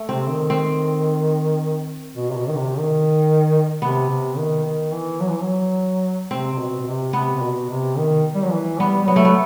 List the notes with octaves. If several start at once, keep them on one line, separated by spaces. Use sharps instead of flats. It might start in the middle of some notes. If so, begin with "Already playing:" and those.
Already playing: A3
C3 C4
D#3
C4
B2
C3
B2
D#3
C3
D#3
C3 B3
C3
D#3
D#3
E3
F#3
E3
F#3
C3 C4
C3
B2
B2
C3
C3 B3
C3
B2
C3
D#3
G3
F#3
E3
G3 B3
G3
F#3 B3
A3
B3